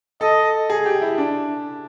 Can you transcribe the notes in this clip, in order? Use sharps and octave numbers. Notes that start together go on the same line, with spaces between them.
A4 D#5
G#4
G4
E4
D4